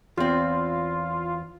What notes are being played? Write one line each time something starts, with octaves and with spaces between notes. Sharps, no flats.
E2 C4 F4